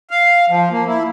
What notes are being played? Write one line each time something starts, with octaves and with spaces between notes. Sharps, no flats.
F5
F3
A#3
E4